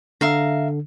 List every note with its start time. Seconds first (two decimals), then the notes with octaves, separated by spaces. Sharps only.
0.21 D3 E5 F5 A#5